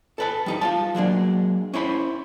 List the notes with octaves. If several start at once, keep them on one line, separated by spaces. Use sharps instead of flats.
A4 B4 A5
G3 D#4 G4
F4 F5 A5
F#3 G#3 A#3 D4
C#4 E4 C5 B5